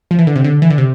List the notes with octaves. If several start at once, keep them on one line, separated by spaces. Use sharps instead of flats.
F3
E3
D3
C3
D3
E3
D3
C3